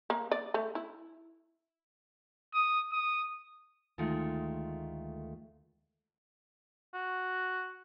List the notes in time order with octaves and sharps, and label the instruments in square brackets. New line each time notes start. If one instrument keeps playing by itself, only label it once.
[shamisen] A#3
D5
A3
E4
[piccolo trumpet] D#6
D#6
[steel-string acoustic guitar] D2 D#3 G#3 A3 F4
[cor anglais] F#4